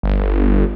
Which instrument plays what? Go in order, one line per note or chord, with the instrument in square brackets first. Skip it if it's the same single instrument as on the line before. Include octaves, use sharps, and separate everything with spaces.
[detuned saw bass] G1